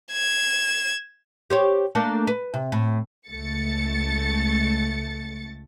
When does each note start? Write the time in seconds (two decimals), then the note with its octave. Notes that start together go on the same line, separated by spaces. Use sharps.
0.12 G#6 E7
1.50 G4 C5 C#5
1.95 A3 A#3 D4
2.27 B4
2.54 C3
2.72 A2
3.29 C#2 A3 A6 C#7